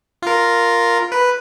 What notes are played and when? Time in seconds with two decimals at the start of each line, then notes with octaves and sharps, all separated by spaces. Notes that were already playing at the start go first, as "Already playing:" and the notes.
0.22 F4 A#4
1.12 B4